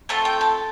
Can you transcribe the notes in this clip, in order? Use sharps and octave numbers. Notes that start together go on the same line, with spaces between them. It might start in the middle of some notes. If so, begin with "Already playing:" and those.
A3 C4 F4 A4 A5
G5
A5